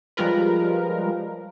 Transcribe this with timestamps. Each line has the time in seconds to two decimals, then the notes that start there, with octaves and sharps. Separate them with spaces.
0.17 F3 G3 G#3 F4 A#4 B4